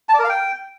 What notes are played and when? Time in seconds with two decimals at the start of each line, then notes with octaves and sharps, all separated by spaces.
0.09 A5
0.14 D5
0.19 A#4
0.24 F5
0.29 G5